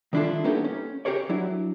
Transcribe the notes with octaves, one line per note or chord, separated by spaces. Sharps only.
D#3 G3 D4 E4 F4 A4
A#3 B3 C#4 D#4 G4 A4
C#4
G4 G#4 A#4 C#5 D5
F#3 D4 E4